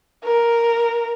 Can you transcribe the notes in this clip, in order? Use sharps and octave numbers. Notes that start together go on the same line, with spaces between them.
A#4